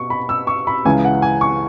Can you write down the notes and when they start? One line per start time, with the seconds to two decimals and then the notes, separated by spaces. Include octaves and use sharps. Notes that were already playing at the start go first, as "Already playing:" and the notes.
Already playing: B2 C#6
0.10 B5
0.29 E6
0.47 C#6
0.67 B5
0.85 C#2 C#3 E3 G#5
1.05 F#5
1.22 G#5
1.41 C#6